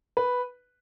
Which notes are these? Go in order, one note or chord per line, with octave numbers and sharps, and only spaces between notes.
B4